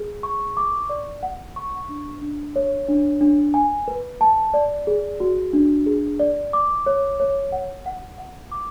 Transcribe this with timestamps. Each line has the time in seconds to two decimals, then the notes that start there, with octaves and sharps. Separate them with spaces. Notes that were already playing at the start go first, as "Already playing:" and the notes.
Already playing: G#4
0.23 C#6
0.57 D6
0.89 D5
1.23 F#5
1.56 C#6
1.89 D4
2.21 D4
2.56 C#5
2.89 D4
3.21 D4
3.54 G#5
3.88 B4
4.21 A5
4.54 D5
4.87 G#4
5.20 F#4
5.53 D4
5.86 G#4
6.20 D5
6.53 D6
6.86 C#5
7.20 C#5
7.52 F#5
7.86 F#5
8.18 F#5
8.52 D6